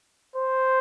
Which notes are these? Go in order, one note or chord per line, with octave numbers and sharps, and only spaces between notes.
C5